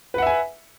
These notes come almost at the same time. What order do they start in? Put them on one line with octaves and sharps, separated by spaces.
B4 F#5 E5 G#5